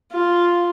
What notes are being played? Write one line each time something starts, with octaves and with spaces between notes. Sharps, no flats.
F4